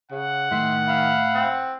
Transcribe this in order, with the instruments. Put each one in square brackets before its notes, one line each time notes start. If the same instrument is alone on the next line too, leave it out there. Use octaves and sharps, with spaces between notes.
[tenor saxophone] C#3 [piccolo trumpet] F#5
[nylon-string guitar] A2 [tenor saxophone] D#3 [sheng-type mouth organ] E5 C6 F#6
[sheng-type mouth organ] E5 F5 B5
[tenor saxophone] C4